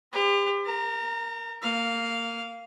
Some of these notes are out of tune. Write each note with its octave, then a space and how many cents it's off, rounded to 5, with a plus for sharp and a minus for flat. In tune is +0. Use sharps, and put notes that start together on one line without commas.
G4 +35 C5 -40
A#4 +0 A#5 -40
A#3 -20 F5 +0